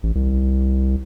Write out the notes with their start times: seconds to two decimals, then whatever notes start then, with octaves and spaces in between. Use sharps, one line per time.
0.03 A1
0.15 C2